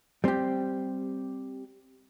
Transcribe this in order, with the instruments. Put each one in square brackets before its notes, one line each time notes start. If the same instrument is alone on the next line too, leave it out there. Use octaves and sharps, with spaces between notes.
[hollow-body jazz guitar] G3 C4 G4